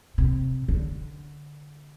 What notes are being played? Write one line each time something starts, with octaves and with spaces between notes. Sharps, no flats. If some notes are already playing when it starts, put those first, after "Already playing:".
C3
D3